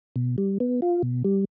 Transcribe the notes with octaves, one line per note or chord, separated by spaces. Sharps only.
B2
G3
B3
F4
B2
G3